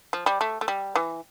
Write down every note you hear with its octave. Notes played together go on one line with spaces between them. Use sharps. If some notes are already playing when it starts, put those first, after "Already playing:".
F3
G3
A3
A3
G3
E3